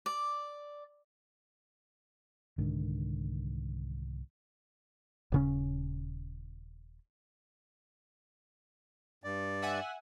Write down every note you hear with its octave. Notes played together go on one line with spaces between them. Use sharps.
D5
C2 G#2 D3 D#3
D#1 C#3 C#4
G2 D5
E5 F#5 G#5